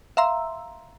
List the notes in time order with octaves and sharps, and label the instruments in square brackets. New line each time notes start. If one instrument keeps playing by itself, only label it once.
[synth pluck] E5 F5 A#5 C6 E6